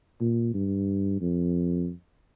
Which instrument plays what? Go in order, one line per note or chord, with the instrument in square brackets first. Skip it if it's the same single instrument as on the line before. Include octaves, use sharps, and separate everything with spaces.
[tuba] A#2
G2
F2